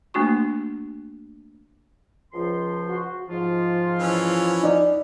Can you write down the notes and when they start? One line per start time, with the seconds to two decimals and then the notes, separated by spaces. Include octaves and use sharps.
0.14 A3 A#3 D4 F#4 C#6
2.33 C#2 F3 C6
2.89 F#4
3.29 G#2 F3 F4
3.99 E3 C#4
4.63 D#4 D5